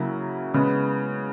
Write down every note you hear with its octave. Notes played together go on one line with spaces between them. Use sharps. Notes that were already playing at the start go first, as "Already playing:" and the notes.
Already playing: C#3 F#3 A#3 E4
C#3 G#3 B3